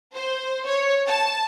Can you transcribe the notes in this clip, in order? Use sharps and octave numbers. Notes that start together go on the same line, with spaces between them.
C5
C#5
A5